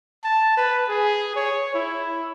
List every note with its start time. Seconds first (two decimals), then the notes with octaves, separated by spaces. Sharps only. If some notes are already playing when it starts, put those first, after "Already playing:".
0.24 A5
0.57 B4
0.89 G#4
1.36 C#5
1.75 E4